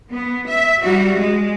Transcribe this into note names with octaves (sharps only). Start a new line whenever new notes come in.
B3
E5
G3 F#4
G#3